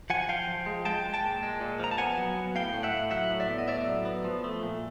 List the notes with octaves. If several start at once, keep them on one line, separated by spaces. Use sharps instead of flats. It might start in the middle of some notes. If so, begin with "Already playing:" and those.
F3 F#5 G#5
F3 F5 G5
F3
G#3
G#3 G5 A5
G#3
G5 A5
A#2
G#3
A#2
F3 A#5
A5
B3 F#5 G#5
F#3
B3
A2 F5 G5
A2
E5 F#5
A2
F#3 E5 F#5
A2
D5 E5
B3
D#5
A2 D5 E5
F#3
B3
F3
A3
A#2